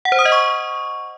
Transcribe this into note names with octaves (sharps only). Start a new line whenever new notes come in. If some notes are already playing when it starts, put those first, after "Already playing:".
F#5
C5
D#6
D#5
C#6